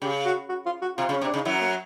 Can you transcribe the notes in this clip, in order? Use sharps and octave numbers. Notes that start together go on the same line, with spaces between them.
C#3 G4
F#4
F#4
F4
F#4
C3 F4
C#3
C#4
C3 D4
C#3 D#4
F#2 F#3 E4
A#3